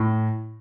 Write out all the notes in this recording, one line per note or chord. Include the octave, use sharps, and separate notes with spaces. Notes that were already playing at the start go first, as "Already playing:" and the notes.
Already playing: A2